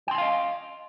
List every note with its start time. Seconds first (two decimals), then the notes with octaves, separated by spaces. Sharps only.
0.08 G5
0.11 C6
0.15 G#5
0.18 F5
0.22 D#5